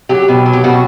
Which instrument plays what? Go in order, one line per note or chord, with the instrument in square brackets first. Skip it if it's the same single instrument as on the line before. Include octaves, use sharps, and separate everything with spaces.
[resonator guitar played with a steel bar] F#3 G4
B2
F#3
G4
B2 F#4